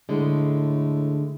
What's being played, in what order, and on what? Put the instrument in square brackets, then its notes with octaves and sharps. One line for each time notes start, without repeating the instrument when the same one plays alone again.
[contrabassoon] A2 [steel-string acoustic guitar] D3 G#3